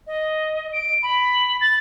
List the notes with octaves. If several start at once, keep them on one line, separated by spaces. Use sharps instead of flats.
D#5
D7
B5
A6